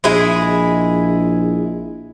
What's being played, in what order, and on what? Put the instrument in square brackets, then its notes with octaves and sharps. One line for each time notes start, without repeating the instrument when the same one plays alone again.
[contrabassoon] A#1 [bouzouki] G#3 E4 G#4